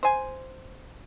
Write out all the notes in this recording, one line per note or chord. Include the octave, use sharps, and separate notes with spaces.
C5 G#5